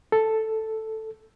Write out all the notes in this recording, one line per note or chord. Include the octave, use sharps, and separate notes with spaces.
A4